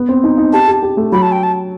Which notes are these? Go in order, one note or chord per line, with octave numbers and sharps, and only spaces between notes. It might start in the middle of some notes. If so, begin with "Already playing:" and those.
Already playing: B3
C4
D#4
D#4
G4 A5
G4
G4
A3
F#3 B5
A5
G5
A5